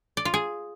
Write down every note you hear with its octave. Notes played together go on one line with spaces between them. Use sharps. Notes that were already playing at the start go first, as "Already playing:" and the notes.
D5
F4
G#4